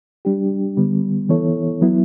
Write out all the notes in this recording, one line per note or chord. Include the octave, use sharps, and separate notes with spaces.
G3 D4 G4
D3 G3 B3
E3 B3 E4 A4 C#5
F#3 B3 E4